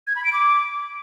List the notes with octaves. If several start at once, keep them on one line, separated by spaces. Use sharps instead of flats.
G#6
B5
D7
D6